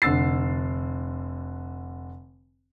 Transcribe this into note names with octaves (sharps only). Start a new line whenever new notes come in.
F1 D3 E6 A6 C7